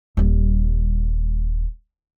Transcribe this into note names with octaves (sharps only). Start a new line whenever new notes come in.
D#1 G3